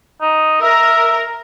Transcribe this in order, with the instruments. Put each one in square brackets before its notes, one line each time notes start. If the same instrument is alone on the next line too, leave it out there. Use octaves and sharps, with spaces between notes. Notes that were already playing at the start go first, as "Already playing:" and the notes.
[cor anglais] D#4
[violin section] A#4 [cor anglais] E5